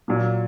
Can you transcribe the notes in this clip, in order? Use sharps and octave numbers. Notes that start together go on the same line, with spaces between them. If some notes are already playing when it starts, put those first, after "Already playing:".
A#2 F#3 A#3